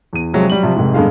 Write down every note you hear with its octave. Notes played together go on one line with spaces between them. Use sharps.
E2 D#7
C3 F3 F#3 G#3
F#3 G3 F#7
C3 F3 G3
F1 G#2
E1 G2 D3 G#3 F5